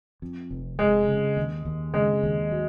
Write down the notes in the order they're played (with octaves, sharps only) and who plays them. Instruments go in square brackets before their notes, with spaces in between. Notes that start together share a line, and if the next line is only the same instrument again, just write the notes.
[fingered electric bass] F2
F1
[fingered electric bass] F1 [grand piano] G#3
[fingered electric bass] C#3
D#2
D#2
[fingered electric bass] C#3 [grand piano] G#3
[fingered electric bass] D#2
F#3